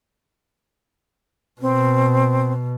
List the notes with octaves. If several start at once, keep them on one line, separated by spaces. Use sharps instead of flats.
B2 C4